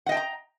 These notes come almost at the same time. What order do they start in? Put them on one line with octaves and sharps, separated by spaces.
F#5 D#5 G5 A5 A#5